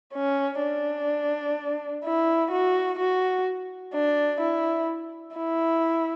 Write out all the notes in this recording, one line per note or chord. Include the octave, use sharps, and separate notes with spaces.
C#4
D4
E4
F#4
F#4
D4
E4
E4